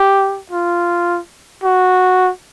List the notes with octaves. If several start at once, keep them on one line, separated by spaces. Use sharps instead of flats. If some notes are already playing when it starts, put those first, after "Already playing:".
Already playing: G4
F4
F#4